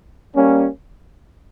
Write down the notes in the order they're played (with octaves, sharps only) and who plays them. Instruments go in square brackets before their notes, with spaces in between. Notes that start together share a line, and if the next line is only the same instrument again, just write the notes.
[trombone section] G3 A#3 C#4